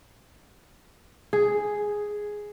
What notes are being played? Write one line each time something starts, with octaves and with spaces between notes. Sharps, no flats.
G#4